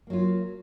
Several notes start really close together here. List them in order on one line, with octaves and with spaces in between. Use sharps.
A#3 F#3 F4